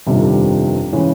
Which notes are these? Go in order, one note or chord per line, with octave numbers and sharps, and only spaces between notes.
G1 F2 C3 D#3 G3
C#3 E3 G#3 C#4